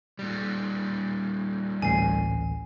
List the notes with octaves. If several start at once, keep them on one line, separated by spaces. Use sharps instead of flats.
A#2 G3
A1 D2 G#5 C7